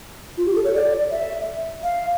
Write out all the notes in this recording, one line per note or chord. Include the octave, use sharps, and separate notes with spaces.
F4
G4
A4
C#5
D5
E5
F5